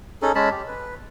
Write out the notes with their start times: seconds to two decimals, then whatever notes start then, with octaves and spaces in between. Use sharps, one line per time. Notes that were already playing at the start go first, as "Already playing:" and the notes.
0.22 C#4 D#4 G#4 A4
0.35 G#3 C#4 A5 B5
0.51 G4
0.67 B4